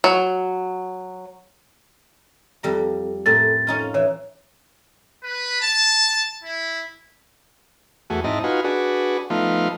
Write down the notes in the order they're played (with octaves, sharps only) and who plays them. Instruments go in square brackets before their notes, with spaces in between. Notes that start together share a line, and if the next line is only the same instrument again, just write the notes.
[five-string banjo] F#3
[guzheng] F2 G3 A#5
[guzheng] A2 C4 A#4 [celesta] A6
[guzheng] C#4 D#4 F4
[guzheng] E3 [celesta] C#5
[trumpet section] B4
A5
E4
[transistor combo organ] E2 A3 F#4 G#4
G#2 C4 D#4 E4 D#5 A5
D#4 F4 F#4 B4 G#5
D4 F#4 G#4 B4
F3 A3 B3 D#4 F4